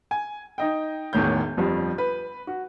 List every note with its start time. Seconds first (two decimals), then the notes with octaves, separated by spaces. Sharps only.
0.11 G#5
0.58 D#4 D#5 G5
1.13 E1 E2 A2 D#3 C#5 G6
1.57 G1 F2 F3 G3
1.98 B4
2.47 F#4